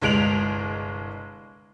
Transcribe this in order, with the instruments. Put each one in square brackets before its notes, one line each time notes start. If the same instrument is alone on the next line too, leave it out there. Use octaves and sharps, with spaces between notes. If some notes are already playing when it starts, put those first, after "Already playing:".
[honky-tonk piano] G1 C2 G#3 D7 F7 F#7